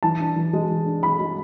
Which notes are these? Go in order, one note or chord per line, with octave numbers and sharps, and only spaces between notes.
E3 A5
D4
E3
G#3
E3
D4
E3 B5
G#3